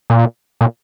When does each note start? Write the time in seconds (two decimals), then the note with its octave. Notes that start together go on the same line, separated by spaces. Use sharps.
0.10 A#2
0.61 A#2